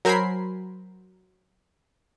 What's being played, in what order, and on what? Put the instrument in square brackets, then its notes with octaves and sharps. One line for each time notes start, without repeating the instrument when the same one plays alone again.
[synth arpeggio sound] F#3 A#4 C5 G#5 B5 C7